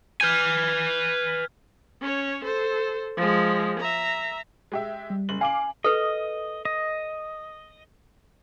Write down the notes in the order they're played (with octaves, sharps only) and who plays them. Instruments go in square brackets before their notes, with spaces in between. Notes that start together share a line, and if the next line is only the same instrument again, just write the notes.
[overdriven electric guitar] B4 G#5 [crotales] F6 G6 G#6
[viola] C#4 C#5
A4 C5
F3 G#3
E5 A#5
[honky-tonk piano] G#3 G4 E5
[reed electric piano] G3
[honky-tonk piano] F#1 F#7
[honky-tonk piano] F5 D6 F#7 [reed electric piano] G#5
[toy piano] A4 B4 [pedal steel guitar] D#5
[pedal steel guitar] D#5